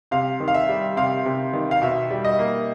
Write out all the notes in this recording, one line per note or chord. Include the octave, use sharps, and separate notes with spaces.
C3 F5
D#3
F5
E5
G3
C3 F5
C3
D#3
F5
B2 E5
G3
D#5
A#3